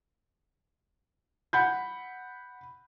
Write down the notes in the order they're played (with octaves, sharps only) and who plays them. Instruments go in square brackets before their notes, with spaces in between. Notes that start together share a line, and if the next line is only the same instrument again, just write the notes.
[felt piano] F#5 B5 G6